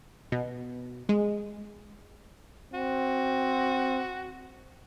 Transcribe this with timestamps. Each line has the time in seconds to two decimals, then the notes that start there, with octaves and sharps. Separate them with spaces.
0.32 B2
1.09 G#3
2.74 C4 F#4